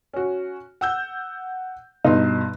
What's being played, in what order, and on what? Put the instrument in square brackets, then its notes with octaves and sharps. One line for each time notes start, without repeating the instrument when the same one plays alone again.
[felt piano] C#4 F#4
F#5 E6 G6
[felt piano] G2 B2 C6 [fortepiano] D#4